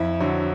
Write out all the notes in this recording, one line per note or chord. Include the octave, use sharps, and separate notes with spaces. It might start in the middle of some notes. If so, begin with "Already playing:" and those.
Already playing: F2 E4
D3 F#3